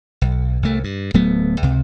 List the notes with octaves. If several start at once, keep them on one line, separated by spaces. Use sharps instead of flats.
B1
C2 A3
G2
D1 F#3 A3 B3
C#2 C3